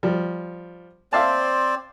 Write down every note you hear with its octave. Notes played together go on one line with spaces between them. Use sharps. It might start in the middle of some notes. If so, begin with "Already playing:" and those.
F3 G3
C4 C5 D5 E5 F5 A5